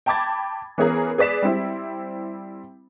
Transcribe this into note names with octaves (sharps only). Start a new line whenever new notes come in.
G5 A5 B5 D6 G#6 A6
E3 B3 C#4 G#4 A#4
G#4 B4 D5 B6 E7
G3 C4 E4